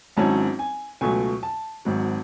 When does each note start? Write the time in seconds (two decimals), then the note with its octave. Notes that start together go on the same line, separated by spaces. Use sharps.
0.17 G#1 G#2 F#3 C#4 E4 A5
0.59 G#5
1.01 C#2 B2 F#3 A3 G#5
1.43 A5
1.85 G#1 G#2 F#3